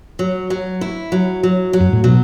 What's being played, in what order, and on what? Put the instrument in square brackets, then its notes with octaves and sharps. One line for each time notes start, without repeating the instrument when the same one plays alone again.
[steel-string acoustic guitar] F#3
F#3
E4
F#3
F#3
F#3
[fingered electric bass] F#2
A2
[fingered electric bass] B2 [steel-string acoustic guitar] F#3